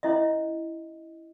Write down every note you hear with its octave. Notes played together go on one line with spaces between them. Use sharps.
C#4 E4 D#5 E5